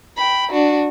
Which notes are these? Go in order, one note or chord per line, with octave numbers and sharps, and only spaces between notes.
G5 B5
D4 F#4